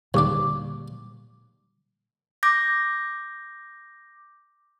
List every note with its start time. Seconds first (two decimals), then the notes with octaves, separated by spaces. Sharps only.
0.14 D#2 A#2 D3 G3 D4 C#6 D6
2.43 D6 G6 A#6